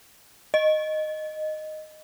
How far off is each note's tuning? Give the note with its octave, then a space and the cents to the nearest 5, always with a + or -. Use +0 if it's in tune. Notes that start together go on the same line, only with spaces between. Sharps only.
D#5 -10